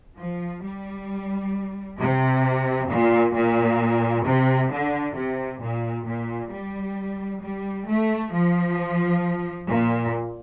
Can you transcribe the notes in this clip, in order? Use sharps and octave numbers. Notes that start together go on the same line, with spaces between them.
F3
G3
C3
A#2
A#2
C3
D3
C3
A#2
A#2
G3
G3
A3
F3
A#2